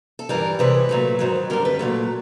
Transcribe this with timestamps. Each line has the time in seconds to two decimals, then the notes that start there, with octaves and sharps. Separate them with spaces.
0.19 A4
0.29 G2 E3 G3 A#4
0.59 C3 E3 G#3 B4
0.89 A#2 F#3 A3
1.19 G#2 D#3 F#3
1.50 F#2 D3 G3 A#4
1.65 B4
1.79 A#2 F#3 A3